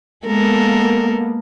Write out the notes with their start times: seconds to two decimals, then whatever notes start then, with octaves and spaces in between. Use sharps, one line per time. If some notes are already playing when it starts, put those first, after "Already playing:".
0.26 G#3 A#3 B3 A4 A#4